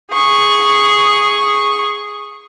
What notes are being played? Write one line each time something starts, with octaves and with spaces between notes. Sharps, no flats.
G#4 C#6